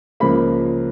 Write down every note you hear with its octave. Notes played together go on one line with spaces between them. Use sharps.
C#2 C#3 F3 A#3 B5